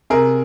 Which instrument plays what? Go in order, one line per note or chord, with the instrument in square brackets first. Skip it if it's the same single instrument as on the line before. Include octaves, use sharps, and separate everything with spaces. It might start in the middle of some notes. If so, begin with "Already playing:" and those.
[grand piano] C3 G#4 A#4